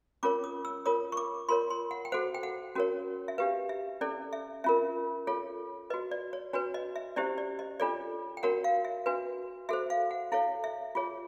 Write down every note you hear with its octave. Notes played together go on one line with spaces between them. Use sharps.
C#4 F4 A#4 C#5 D6
D#6
E6
F4 A#4 C#5 D#6
C#6
D6
F4 A#4 C#5 C6
C6
F#5
G5
F#4 A4 C5 F#5
G5
F#5
C#4 F#4 A#4 C#5
E5
D4 G4 B4 F5
E5
C#4 E4 A4 D5
E5
C#4 F4 A#4 E5
F4 A4 C#5
F#4 B4 D#5
D5
C#5
D4 F#4 B4 C#5
D#5
E5
C#4 E4 G4 C5 D5
D5
D#5
D4 F4 A4 C#5 D5
G5
D4 F#4 A#4 C#5 F#5
F5
E5
D4 F#4 B4
F#4 A4 C5 E5
F5
F#5
E4 A4 C#5 F5
E5
F4 G#4 C#5